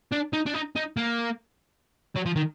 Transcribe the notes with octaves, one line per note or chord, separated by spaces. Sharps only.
D4
D#4
D4
D#4
D#4
A#3
F#3
F3
D#3